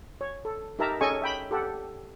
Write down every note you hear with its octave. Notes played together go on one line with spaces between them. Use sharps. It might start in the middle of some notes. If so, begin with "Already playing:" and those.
C#5
A4
D#4 G4 A#4 E5 A5 A#5
C#4 G#4 A4 D#5 G#5 C#6
E5 G5 B5
G4 A4 F#5